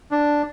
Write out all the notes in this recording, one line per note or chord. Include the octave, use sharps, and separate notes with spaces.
D4